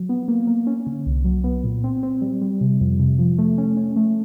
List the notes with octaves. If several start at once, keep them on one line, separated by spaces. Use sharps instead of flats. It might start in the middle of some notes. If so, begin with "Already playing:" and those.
Already playing: F#3
B3
A#3
A#3
C#4
D3
C2
F#3
B3
A#2
C4
C4
G3
G3
C3
F2
C3
F3
A3
C#4
C#4
A3